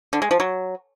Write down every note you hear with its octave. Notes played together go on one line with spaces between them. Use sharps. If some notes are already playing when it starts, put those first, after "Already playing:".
D3
G#3
F3
F#3